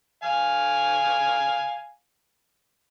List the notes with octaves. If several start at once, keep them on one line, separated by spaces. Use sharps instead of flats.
F5 G#5